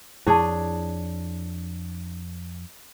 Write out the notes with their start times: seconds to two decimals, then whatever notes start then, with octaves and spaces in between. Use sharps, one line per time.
0.27 F2 D4 E4 G#4 C#5 A5